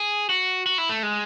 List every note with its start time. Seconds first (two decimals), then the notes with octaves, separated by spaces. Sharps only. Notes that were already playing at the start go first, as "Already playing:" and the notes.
Already playing: G#4
0.29 F#4
0.66 F#4
0.78 E4
0.89 A3
1.03 G#3